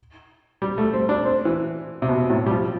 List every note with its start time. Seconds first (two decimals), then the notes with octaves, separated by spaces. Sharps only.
0.62 G3
0.78 A3
0.93 C4
1.09 D4
1.25 C4
1.45 E3
2.02 C3
2.09 B2
2.30 A2
2.46 G3
2.51 F3